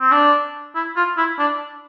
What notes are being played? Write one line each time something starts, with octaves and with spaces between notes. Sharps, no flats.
C4
D4
E4
F4
E4
D4